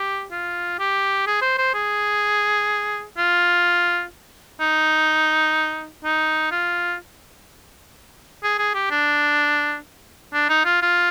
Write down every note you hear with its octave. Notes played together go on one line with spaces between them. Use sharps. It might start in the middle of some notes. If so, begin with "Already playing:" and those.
Already playing: G4
F4
G4
G#4
C5
C5
G#4
F4
D#4
D#4
F4
G#4
G#4
G4
D4
D4
D#4
F4
F4